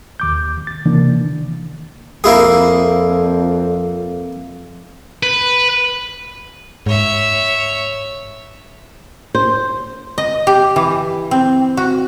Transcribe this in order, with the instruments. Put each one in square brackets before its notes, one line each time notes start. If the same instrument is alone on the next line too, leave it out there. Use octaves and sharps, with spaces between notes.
[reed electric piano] D#2 D6 G6
A6
C3 D#3 E3 A#3 D4
[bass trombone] F2 [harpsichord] A#3 E4 G#4
[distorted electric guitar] B4
[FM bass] G#2 [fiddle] C#5 E5
[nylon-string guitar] C5
[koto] D#5
G4
E3
C4
F#4